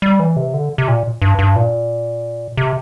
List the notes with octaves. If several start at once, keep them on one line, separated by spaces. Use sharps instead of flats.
G3
E3
C3
D3
C3
A#2
G2
G2
A#2
C3